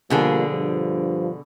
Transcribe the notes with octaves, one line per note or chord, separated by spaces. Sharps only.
B2 D3 F3 G3 A#3 G#4
G2 F3